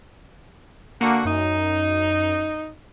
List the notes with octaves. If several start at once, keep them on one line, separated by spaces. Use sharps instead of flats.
D3 A#3 F#4 F#5
F#2 D#4